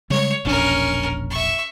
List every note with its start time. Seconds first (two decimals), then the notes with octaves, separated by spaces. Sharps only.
0.10 C#3 G3 G#3 C#5
0.45 E1 A#1 C#4 D4 A#4
1.30 E5 C#6